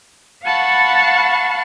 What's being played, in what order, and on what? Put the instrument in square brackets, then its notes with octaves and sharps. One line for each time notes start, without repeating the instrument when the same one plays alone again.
[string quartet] F5 F#5 A5 B5 C#6